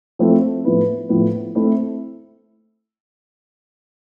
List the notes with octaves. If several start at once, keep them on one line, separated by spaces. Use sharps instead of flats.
F3 A3 C4 E4
A2 F3 B3 E4 B4
A2 F3 B3 E4 B4
A3 C4 E4